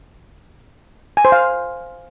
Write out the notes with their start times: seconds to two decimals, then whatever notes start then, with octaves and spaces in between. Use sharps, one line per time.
1.17 G#5
1.25 C5
1.32 F5